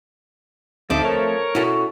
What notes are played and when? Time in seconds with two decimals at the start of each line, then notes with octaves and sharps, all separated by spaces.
0.90 D2 F3 A3 C4 D#4 A4 D6
1.05 A#4 C#5
1.55 B2 C#4 E4 F#4 A4